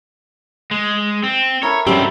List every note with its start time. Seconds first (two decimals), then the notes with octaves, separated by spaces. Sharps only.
0.71 G#3
1.24 C4
1.63 E4 A4 A#4 C#5
1.87 G2 F#3 G3 C4 C#4 E4 G4 A4